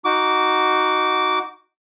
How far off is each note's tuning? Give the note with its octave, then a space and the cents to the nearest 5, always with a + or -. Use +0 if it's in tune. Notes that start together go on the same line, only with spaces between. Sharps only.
D#4 +0 F#4 +0 D6 -15